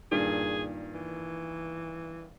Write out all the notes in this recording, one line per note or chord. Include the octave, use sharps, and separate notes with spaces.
G2 A#2 D#3 G#4
E3